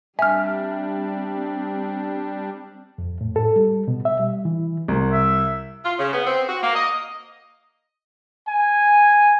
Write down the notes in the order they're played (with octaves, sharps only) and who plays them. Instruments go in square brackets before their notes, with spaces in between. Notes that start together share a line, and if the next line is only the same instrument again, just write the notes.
[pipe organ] G3 D4 [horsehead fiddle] C4 [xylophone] E5 [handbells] G#5 F6
[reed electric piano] F2
A2
A4
G3
B2
E5
G3
E3
[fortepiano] C2
[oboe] E5
[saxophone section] F4
C#3
B3
C4
F#4
A#3
D#5
[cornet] G#5